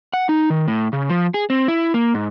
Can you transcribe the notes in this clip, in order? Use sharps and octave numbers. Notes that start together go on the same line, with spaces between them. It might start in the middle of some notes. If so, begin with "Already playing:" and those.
F#5
D#4
D#3
A2
C#3
F3
G#4
C4
E4
A#3
G#2